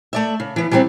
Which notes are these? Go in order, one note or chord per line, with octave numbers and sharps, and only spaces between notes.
A3 D5 E5
C#3
E3 B3
E3 F#3 G3 A3 C4